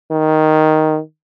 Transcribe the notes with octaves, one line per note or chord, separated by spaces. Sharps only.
D#3